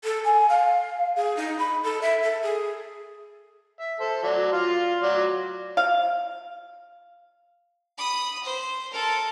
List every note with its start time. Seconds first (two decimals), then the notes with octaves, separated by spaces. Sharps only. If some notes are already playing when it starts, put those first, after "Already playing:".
0.04 A4
0.24 G#5
0.49 F5
1.16 G#4
1.37 D#4
1.59 B5
1.84 A4
2.02 E5
2.23 A4
2.42 G#4
3.79 E5
4.00 A4 C5
4.23 F#3 D5
4.53 F4 F5 C6
5.02 F#3 D5
5.77 F5
7.98 B5 D#6
8.44 C5
8.91 A4 A#4